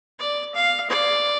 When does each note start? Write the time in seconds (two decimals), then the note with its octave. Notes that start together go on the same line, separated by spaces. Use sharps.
0.19 D5
0.55 F5
0.89 D5